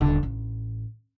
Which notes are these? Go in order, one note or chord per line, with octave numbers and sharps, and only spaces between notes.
D#1 D3
A1